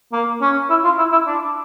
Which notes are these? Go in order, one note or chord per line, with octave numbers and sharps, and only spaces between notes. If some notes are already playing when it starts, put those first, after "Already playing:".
A#3
C#4
E4
F4
E4
E4
D4